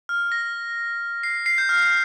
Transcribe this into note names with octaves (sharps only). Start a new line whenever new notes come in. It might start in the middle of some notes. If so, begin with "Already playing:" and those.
F6
A#6
C7
C7
G6
F6